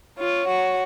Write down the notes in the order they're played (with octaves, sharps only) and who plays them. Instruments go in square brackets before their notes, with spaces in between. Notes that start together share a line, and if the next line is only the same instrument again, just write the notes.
[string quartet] F4 [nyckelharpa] C#5
[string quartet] F#4